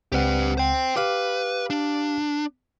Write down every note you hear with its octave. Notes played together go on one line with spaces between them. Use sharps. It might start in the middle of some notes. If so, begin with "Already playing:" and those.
C#2 C4 G4 B4 F#5
C5 G5
G4 B4 F5 D6
D4